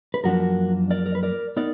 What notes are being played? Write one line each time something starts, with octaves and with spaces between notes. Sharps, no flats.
B4
F#2 F3 A#3 D4 F#4 A#4
A#4 D5
A#4
B4
A#4 D5
B3 D#4 A#4 D5